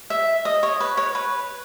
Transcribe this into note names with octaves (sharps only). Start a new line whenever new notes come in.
E5
D#5
C#5
B4
C#5
B4